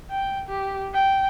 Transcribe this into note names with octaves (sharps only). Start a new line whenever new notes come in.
G5
G4
G5